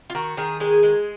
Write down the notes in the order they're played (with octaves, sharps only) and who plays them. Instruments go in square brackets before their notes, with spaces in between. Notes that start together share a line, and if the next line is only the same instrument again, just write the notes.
[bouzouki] F4
D#3 F#4
D#3 G#4
G#3 G#4
G#3